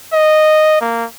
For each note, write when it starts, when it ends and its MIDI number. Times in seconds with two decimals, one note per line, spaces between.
0.13 0.80 75
0.81 1.05 58